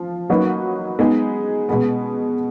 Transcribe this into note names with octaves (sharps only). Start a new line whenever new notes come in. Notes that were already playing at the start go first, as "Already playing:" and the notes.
Already playing: F3 F4
F#3 A#3 D#4 F#4 B4
G#3 B3 D#4 G#4
B2 G#3 B3